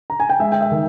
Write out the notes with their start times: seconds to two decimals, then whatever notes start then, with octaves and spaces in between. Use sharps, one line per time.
0.10 A#5
0.20 G#5
0.30 G5
0.39 G#3 E5
0.52 G5
0.61 E5
0.72 D#3